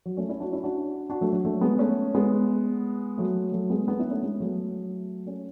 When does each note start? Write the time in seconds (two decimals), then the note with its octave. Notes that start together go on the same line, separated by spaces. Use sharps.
0.06 F#3
0.17 A3 C#4
0.29 C#4 E4
0.40 D4 F#4
0.53 C#4 E4
0.63 D4 F#4
1.10 D4 F#4
1.21 F#3 A3
1.32 F#3
1.45 F#3 A3
1.61 G#3 B3
1.79 A3 C#4
2.15 G#3 B3
3.18 F#3 A3
3.52 F#3 A3
3.70 G#3 B3
3.88 B3 D4
3.99 C#4 E4
4.10 A3 C#4
4.23 G#3 B3
4.40 F#3 A3
5.26 A3 C#4